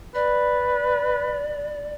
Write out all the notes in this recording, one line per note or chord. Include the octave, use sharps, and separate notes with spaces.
B4 D5